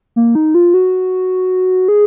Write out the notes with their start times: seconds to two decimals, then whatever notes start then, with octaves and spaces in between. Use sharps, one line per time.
0.16 A#3
0.35 D#4
0.55 F4
0.74 F#4
1.88 G#4